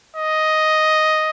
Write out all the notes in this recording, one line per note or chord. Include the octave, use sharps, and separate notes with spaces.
D#5